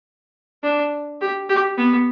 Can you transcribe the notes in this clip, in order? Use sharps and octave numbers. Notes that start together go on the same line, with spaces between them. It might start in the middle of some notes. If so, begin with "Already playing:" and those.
D4
G4
G4
B3